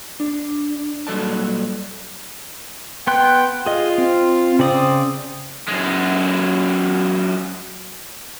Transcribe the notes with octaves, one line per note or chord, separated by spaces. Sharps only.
D4
A#2 F#3 G3 A4 D5 A5
B3 G5 C6 F#6
F4 G#4 D#5
C4
C#3 C4 D5 D#6
F#2 G#3